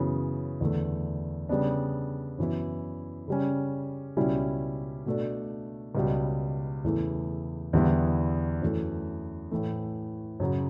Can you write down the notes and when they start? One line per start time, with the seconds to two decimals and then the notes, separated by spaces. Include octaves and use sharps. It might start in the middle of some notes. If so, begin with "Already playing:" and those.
Already playing: F#2 C#3 E3 B3
0.61 E2 D3 A3
1.49 C#3 G3 B3 D4
2.39 F#2 E3 B3 E4
3.28 C#3 G3 C#4
4.17 C#2 B2 G3 C#4 E4
5.06 B2 A3 D4
5.95 C#2 B2 G3
6.84 E2 C#3 E3 A3 E4
7.73 E2 D3 G3 B3 E4
8.62 F#2 E3 A3
9.51 A2 E3 A3
10.40 F#2 C#3 F#3